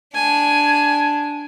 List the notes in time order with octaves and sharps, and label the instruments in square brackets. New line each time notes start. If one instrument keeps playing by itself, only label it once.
[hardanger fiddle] D4 [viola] G#5